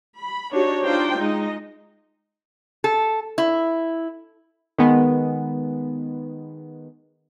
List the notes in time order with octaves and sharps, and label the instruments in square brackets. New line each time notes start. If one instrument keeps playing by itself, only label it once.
[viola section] B5
D4 D#4 F#4 G4 C#5
D4 D#4 F4 C5 G5
G#3 D#4 D#5
[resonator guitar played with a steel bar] A4
E4
[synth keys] D#3 G#3 B3